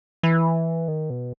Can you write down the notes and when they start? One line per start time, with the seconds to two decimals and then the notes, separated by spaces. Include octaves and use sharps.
0.23 E3
0.88 D#3
1.10 B2